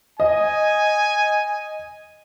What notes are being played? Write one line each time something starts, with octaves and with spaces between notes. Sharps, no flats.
D#5 G#5